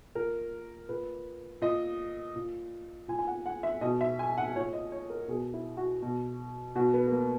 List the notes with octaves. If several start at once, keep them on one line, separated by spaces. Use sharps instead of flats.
A#2 A#4
A#2 B4
A#2 D#5
A#2
A#2 G#5
G#5
F#5
F#5
E5
B2 D#5
E5
G#5
F#5
A#2 C#5
D#5
C#5
A#4
B2 G#4
E4
F#4
B2
B2 F#4
B3
B3
A#3